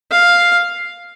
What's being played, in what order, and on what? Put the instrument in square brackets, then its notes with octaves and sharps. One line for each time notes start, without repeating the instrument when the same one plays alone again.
[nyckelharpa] F5